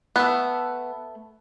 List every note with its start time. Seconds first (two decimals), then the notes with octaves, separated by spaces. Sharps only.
0.16 A3 B3 A5 F#6